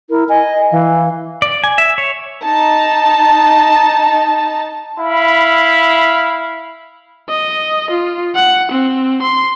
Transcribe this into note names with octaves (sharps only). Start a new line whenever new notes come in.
E4 A#4
D#5 G#5
E3 F5
D5
G#5
E5
C#5
D#4 A5
E4 F5 B5
D#5
F4
F#5
C4
C6